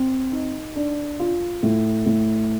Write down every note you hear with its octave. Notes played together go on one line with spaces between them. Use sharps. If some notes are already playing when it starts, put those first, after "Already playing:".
Already playing: C4
D#4
D4
F4
A2
A2